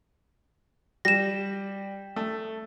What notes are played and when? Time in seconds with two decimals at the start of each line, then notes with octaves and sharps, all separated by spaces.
1.05 G3 A#6 E7
2.16 A3